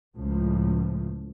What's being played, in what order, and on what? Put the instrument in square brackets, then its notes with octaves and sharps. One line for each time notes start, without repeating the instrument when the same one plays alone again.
[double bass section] C#2 A2 F3